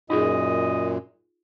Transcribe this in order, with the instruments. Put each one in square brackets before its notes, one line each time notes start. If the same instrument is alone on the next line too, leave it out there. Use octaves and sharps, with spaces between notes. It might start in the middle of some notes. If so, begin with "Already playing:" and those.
[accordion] F#2 A#2 [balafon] D#4 F4 G#4 [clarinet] D#5